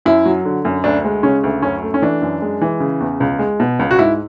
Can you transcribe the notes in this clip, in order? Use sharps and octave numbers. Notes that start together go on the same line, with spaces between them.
F#2 E4
F#3
D3
F#2
D2 D4
G#3
C#3 C#4
D2
F#2 C#4
A3
C#4
E3 D4
F#2
G#3
E3
C#3
E2
C#2
G#3
B2
C#2
F#4
G#2 E4